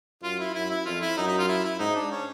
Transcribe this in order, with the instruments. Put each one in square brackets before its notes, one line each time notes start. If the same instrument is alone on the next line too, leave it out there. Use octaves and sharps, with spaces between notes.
[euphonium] F#2 [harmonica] F4
[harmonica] E4
[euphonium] F#2 [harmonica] E4
[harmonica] E4
[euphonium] F2 [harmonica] F4
[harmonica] E4
[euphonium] F#2 [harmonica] D#4
[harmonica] D#4
F4
E4
E4
[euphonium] G#2 [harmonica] D#4
[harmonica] D4
C#4